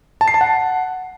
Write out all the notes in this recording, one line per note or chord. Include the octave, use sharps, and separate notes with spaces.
A5
C7
A5
F#5